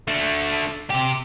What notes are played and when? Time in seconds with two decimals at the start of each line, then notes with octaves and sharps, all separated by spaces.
0.08 D3 A3
0.90 C3 G4